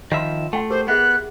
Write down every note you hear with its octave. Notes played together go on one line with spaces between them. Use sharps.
D#3 F3 F4 E5 C6
A3 F#5 G5 C6
G4 A#4 C5 D6
B3 G#4 E5 F#5 F#6